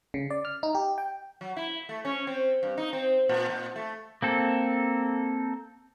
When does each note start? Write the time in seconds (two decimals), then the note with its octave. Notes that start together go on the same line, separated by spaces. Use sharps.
0.14 C#3
0.30 D5
0.45 F6
0.63 D#4
0.75 G4
0.98 G5
1.41 F#3
1.57 E4
1.89 A3
2.05 C#4
2.27 C4
2.63 G2
2.78 D#4
2.93 C4
3.29 A#2
3.50 A#2
3.76 A3
4.22 A#3 C4 A4